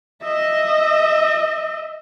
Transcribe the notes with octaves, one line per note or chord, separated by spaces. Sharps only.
D#5 E5